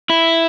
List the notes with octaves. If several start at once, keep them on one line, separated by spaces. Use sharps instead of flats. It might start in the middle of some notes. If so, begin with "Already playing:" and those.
E4